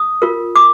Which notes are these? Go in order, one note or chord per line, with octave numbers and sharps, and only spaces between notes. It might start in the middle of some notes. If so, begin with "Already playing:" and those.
Already playing: D#6
F4 A#4
D6